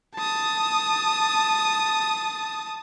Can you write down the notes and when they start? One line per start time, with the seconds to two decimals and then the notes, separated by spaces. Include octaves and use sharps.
0.15 A5 D#6